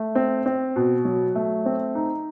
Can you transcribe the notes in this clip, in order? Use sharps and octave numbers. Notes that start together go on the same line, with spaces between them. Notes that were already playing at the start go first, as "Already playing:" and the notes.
Already playing: A3
C4
C4
B2
F#3
A3
C4
D#4